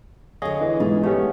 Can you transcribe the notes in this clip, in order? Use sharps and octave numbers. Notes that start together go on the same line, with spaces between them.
D3 G#4 C#5 D#5 F5
E3 D#5
G#2 G#3 F4
A3 B3 C#4 G4